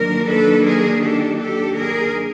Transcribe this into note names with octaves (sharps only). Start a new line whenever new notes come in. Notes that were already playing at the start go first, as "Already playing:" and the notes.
Already playing: D#3 F#3 A#3 D4 A#4
A4 B4
G#4 A#4
G4 A4
G4 A4
G#4 A#4